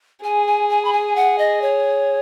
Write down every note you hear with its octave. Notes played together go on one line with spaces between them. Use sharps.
G#4 G#5
G#5
G#5
B5
G#5
F#5
D#5
C#5